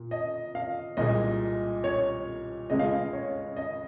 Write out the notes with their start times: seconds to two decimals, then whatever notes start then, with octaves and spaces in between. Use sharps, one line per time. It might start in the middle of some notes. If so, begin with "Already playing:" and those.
Already playing: A#2
0.11 D#5
0.55 F5
0.97 C2 A#2 G#3 D#5
1.84 C#5
2.70 C#2 C#3 G#3 D#5
2.79 F5
2.89 D#5
3.13 C#5
3.57 D#5